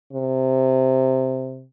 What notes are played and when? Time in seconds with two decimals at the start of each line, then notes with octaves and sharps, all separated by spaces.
0.13 C3